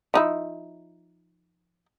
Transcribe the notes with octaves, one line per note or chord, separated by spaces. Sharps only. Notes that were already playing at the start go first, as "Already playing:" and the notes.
F3 D#4 E4